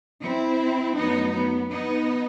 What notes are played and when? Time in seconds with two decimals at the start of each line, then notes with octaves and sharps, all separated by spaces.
0.21 C4 E4
0.96 F#2 F#3 A3 B3 D#4
1.34 B3
1.70 B3 D#4